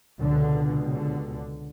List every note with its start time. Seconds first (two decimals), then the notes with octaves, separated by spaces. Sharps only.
0.20 C#2 B2 D3
0.90 D3